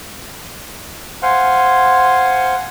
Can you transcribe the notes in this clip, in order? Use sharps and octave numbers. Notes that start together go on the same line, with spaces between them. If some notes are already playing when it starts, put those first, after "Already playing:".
C5 F5 F#5 G#5 C6